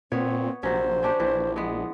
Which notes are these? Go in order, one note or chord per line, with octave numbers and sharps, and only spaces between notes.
A#2 B3 C4 C#5
A#1 C3 F#3 C#4 C5
C#4 D4 G4
A#1 E3
G#3 B3